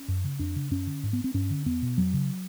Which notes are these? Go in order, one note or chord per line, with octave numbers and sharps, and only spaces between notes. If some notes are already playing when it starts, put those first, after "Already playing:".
Already playing: C#4
F#2
C#3
F2 D4
C#3
F#2 C#4
D3
G#2
B3
C4
G2 C#4
D3
E2 B3
B2
F2 F#3
C#3